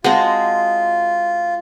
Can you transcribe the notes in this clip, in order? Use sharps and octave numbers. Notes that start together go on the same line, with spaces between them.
G#3 C4 F4 F#4 C5 D#5 A5